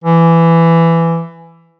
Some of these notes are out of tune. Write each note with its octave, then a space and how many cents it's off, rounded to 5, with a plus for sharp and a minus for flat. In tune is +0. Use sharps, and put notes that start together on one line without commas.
E3 +15